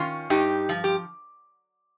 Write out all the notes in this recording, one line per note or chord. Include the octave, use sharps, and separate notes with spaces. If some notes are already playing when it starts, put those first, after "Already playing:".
Already playing: D#3 C#4 F4
G2 D#4 G4
F3
G4